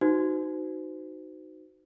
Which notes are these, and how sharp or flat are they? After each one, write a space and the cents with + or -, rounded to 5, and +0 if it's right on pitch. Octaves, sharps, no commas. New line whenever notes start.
D#4 +0 F#4 +0 C5 -40